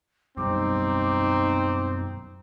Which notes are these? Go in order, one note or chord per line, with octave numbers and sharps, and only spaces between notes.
F#2 B2 G3 C4 D#4 D6